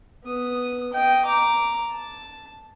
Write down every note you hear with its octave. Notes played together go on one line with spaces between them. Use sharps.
B3 D#6
D#5 G5
A#5 D6
A5